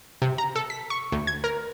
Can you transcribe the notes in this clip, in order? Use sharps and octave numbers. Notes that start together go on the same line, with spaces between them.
C3
A#5
A4
B6
C#6
D2
G#6
A#4